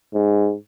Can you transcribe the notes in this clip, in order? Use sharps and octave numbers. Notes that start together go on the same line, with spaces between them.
G#2